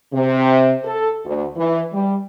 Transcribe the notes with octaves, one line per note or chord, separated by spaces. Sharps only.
C3
A4
D2
E3
G3